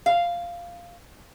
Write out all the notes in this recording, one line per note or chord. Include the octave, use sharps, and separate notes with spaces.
F5